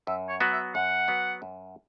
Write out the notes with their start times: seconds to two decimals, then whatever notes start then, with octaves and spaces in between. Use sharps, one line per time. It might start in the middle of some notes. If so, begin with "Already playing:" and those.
0.07 F#2 E5
0.29 C#5
0.40 F#3 B3 F#4 B4
0.52 E5
0.74 F#2 F#5
1.08 F#3 B3 F#4 B4
1.42 F#2